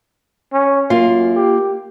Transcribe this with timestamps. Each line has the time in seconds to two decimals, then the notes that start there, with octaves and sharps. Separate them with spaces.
0.52 C#4
0.90 F#2 A#3 F4 F5
1.36 G4